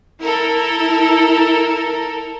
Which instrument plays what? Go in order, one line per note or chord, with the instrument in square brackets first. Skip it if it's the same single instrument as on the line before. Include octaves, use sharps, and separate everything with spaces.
[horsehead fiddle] E4 [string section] A4 A#4